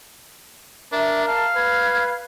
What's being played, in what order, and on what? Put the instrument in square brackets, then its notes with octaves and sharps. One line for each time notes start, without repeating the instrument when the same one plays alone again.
[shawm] D4 [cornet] A#4 [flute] E5
[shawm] F5 [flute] A5
[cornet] B4 [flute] G#6